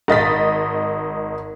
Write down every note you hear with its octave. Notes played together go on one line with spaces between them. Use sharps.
G#1 D#5 A6 B6